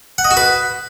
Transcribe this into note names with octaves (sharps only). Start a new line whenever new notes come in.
F#5
D#5
F#4
B4